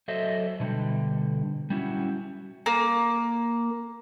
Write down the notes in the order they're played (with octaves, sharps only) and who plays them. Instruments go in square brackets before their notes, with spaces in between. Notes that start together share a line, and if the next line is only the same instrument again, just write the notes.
[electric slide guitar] F#3 A4 C5 D#5 E5
B2 D3 G3
G3 C#4 E4 F#4
[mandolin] A#3